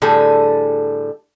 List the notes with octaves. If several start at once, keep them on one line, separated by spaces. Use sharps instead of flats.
A2 D3 G3 G#4 A4